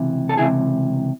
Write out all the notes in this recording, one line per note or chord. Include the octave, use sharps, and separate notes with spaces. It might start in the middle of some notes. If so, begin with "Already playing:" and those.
Already playing: C#2 C3 E3
A4
C#2 C3 E3 E4 G#4